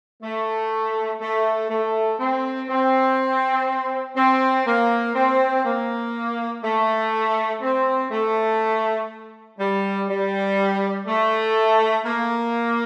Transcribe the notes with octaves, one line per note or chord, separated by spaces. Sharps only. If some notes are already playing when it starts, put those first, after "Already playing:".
A3
A3
A3
C4
C4
C4
A#3
C4
A#3
A3
C4
A3
G3
G3
A3
A#3